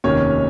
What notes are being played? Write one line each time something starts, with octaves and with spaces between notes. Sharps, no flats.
F1 D#2 D#3 C#4 C#5